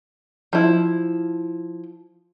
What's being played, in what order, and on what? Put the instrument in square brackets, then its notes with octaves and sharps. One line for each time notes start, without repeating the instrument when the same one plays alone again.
[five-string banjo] F3 E4